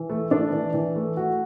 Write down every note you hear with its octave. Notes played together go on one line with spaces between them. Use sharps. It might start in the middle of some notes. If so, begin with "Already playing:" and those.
Already playing: E3
A3
D4
E3
E3
A3
F#4